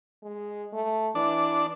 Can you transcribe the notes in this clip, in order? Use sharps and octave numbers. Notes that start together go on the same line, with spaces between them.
G#3
A3
E3 D4